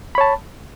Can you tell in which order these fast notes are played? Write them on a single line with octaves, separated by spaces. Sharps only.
B5 C#5 A5